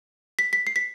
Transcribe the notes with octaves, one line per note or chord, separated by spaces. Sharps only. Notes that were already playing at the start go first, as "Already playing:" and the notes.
B6
B6
C7
B6